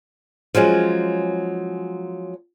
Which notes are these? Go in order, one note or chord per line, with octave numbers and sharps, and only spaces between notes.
F3 F#3 G#3 C#4